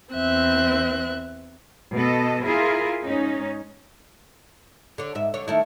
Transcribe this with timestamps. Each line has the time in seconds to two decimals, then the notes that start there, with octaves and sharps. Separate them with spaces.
0.13 E2 C4 E5 F#6
1.95 B2 A4 D#5
2.45 E4 F4 G#4 A#4
3.04 G#2 C#4 D#4
4.98 D3 C#5
5.15 G#2 E5
5.34 D3 C#5
5.48 D#3 A3 E4